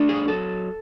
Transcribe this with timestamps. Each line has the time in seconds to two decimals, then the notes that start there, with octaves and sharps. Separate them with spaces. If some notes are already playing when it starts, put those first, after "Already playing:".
Already playing: A3 D4
0.09 G#4
0.28 F#3 A4